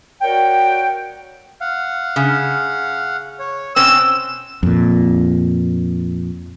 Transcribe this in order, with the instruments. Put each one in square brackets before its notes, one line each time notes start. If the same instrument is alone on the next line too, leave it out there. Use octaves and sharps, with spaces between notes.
[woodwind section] F#4 A#4 C#5 D5 G5
[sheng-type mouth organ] F5 F#5
[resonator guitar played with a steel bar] C#3
[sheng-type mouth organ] C#5
[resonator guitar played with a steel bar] B2 C4 C#4 [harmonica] E6 [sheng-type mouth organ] F#6
[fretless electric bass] F2 A#2